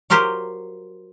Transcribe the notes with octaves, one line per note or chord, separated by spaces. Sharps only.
F#3 F4 G4 A#4 C5